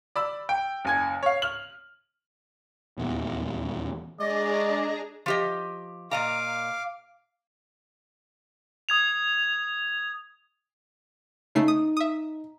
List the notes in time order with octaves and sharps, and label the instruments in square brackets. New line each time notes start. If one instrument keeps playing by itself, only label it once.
[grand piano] D5 B5 E6
G5
F#1 G#5 G#6
C#5 F5
F6 F#7
[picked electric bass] D#1 E2
[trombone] G#3 [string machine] D4 G#4 A#5 [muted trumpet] D5 [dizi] D#5
[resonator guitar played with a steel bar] F3 G4 D#5
[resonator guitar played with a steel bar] A#2 D#5 A#5 [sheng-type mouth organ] F5 D6
[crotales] D#6 G#6 F7
[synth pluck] C#3 A3 C7 [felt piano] D#4
[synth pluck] D#6
E5 D#6